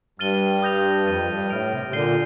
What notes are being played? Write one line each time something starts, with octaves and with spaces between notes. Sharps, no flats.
G2 F6 A6 D#7 G7
D#6 G6 A#6 F7
F2 F6 A6 D#7 G7
G2
A2 F6 A#6 D7 F7
C3
C3
A#2 D3 G6 C7 D#7 G7